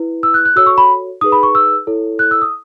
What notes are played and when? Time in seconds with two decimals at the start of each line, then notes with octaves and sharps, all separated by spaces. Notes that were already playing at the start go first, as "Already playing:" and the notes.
Already playing: E4 B4
0.23 E6
0.34 F#6
0.45 F#6
0.56 F#4 A4 C#5 E6
0.66 C#6
0.78 B5
1.21 D#4 G#4 B4 D#6
1.32 B5
1.43 C#6
1.55 E6
1.87 E4 A4 C#5
2.19 F#6
2.31 E6
2.42 D#6